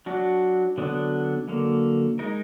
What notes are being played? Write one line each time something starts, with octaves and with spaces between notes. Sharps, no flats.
F#3 D4 F#4
D3 F#3 B3 D4
D3 F#3 A#3
G#3 D#4 A#4